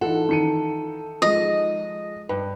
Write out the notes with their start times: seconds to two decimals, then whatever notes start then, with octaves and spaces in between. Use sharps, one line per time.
0.01 E3 D#4 F4 A4 F#5
0.29 D#3 C#7 D#7
1.22 F3 G#3 D#5
2.29 G2 B4